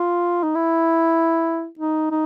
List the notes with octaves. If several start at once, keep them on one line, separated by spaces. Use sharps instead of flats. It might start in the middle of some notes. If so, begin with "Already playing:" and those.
Already playing: F4
D#4
E4
D#4
D#4